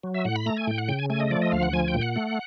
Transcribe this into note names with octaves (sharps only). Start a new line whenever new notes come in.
F#3
E5
A2 F#5
B5
A3 A#5
G#5
A2 G5
F#5
C#3 G5
G#5
A3 G#5
D#5
F3 D5
D#5
D2 F5
F#5
F3 G#5
G5
A#2
F#5
A3